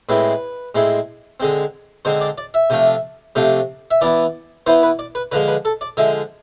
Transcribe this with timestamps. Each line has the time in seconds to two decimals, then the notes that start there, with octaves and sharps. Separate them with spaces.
0.09 A2 G#3 C4 E4 B4
0.75 A2 G#3 C4 E4
1.40 D3 G#3 C4
2.05 D3 G#3 C4 C5
2.21 D5
2.38 D5
2.54 E5
2.70 C3 F3 A3 D4
3.35 C3 F3 A3 D4
3.91 E5
4.01 E3 B3 E4 D5
4.66 E3 B3 E4 C5
4.83 B4
4.99 D5
5.15 B4
5.32 D3 F3 G#3 B4
5.48 B4
5.65 A4
5.81 D5
5.97 D3 F3 G#3 E5